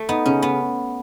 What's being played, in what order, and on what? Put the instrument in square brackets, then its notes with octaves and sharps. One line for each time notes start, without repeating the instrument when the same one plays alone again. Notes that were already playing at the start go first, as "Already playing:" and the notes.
Already playing: [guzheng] A3
[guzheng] B3 [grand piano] D#4
[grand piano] C#3 [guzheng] C#4
[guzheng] B3